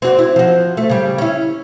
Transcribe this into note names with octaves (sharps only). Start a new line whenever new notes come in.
C4 F#4 D5
E4
F3 F#4
A3
C#3 G3
C#4 E4